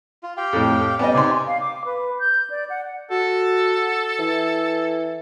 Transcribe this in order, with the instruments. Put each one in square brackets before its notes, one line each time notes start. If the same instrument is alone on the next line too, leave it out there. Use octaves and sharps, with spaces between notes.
[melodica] F4
G4 F5 G5
[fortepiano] F2 A2
[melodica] G3 C#4 D5 [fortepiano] B3 D#5
[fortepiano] C3 D#4 C6 [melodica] G4 D5 G#5
[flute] F5
D6
B4
G6
D5
F#5
[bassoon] F#4 [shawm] A4
[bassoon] E3